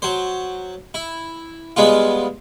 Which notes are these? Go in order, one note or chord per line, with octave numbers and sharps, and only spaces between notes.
F#3 C5
E4
G3 G#3 B3 F4